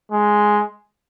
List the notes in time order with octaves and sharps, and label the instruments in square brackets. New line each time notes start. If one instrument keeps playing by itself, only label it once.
[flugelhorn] G#3